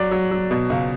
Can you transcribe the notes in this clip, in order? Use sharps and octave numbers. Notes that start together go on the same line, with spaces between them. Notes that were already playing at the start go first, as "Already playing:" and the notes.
Already playing: F#3 D5
F#3
F#3
B2
C#2